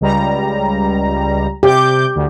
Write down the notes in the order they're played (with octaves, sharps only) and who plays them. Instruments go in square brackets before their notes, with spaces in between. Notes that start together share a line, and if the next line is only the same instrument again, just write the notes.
[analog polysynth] C#2 G3 A#5
[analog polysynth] C3 D6 G6 [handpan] G4
[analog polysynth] D2